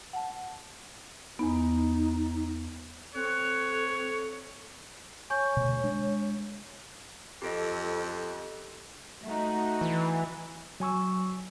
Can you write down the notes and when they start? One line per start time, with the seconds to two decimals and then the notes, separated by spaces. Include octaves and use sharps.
0.13 F#5 A5
1.39 E2 B3 D#4
3.15 C4 A4 C#5 F#6
5.30 C#5 G#5 C#6 G6
5.57 D2 B2
5.84 G#3 D4
7.42 F2 G4 A4 D#5
9.24 A3 D#4 F#4
9.81 E3
10.80 F#3 G#5 C#6 E6